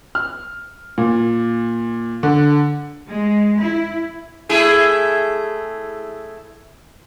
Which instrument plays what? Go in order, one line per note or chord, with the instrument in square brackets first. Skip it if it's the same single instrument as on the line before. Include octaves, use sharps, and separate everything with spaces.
[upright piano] F6
A#2
D3
[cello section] G#3
E4
[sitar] A3 E4 G#4